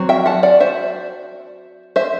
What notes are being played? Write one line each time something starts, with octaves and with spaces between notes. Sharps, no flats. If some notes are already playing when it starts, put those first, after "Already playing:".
Already playing: F#3 C4
E5 G5
F#5 A5
D5 F#5
C5 E5
C5 E5